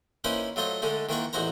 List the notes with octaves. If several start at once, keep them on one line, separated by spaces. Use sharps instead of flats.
A#3 C#4 D#4 E4 B4 C5
F#3 A3 F4 C5 D#5
D3 G#3 A3 D#4
D#3 E3 A#3 F4 F#5 C#6
A1 E2 D#4 F#4 C5 A#5